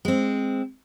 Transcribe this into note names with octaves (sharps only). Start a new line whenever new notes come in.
G#3 C4